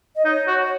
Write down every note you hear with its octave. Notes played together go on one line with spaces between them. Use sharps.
D#5
D#4 C#5
F#4 C#5
C#5